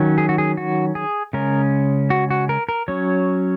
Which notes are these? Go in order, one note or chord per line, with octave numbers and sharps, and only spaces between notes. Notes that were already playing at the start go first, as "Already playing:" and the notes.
Already playing: D#3 F#3 C#4
G#4
F#4
G#4
F#4
G#4
C#3 G#3 C#4 A#4
F#4
F#4
A#4
A#4
F#3 C#4 C#5